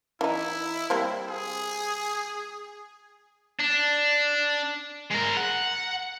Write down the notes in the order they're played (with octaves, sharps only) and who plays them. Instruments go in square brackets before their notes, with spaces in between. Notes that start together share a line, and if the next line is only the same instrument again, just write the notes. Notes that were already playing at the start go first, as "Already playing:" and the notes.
[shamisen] E3 D#4 [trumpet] E4
[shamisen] G3 A#3 C4
[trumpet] G#4
[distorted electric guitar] D4
G#3 A#4
F#5